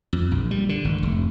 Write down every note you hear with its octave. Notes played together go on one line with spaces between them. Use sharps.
F2
A#1
G3
D3
G#1
F1